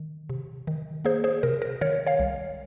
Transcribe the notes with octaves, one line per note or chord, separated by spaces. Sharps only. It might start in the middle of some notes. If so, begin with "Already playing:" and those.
Already playing: D#3
C3
D#3
A#3 G#4 C5
G#4 C5
C3 A#4
A#4
D#3 A#4 C#5
C#5 F5
C2